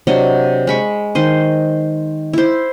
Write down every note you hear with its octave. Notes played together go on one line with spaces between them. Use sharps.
C3 F#3 D4 D#5
G#3 B5 C#6
D#3 C5 D#5
E4 C5